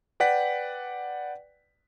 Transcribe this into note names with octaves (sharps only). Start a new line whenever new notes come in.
B4 D5 F#5 G5 B6